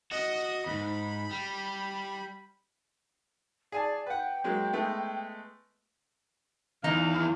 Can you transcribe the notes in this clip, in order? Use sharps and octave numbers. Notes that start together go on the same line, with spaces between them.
F#4 D#5 D#6
E2 G#2 B5
G3
G#4 D5 G#5 A5
B4 F#5 G5
F#3 G#3 A#3
G#3 A3 B3
E2 E3 D#4 F5